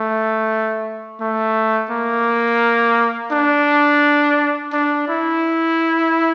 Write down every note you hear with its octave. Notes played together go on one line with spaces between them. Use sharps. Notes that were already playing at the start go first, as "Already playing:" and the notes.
Already playing: A3
A3
A#3
D4
D4
E4